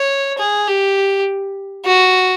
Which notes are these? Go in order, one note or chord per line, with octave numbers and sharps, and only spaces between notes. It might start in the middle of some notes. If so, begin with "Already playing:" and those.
Already playing: C#5
G#4
G4
F#4